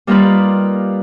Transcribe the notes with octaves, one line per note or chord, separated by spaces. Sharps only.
G3 A#3 D#4 F4 B4 D5